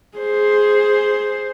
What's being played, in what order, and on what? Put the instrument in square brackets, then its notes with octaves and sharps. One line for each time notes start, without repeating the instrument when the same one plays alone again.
[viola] G#4 C5